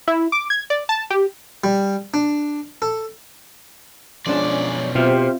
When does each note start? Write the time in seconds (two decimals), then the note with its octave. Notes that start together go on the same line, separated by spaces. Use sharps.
0.08 E4
0.32 D6
0.50 G#6
0.70 D5
0.89 A5
1.10 G4
1.64 G3
2.14 D4
2.82 A4
4.27 B1 F3 G#3 C#4 D4 D5
4.95 B2 C4 F4 G4 C5 E5 F6